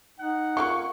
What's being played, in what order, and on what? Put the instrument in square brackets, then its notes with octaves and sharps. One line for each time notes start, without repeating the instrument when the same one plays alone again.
[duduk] D#4 [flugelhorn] F#5
[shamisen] A#3 E4 F4 [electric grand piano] C#6